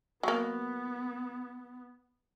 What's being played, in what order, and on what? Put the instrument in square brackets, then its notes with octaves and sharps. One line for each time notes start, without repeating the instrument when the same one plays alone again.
[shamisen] F#3 A#3 [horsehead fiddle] B3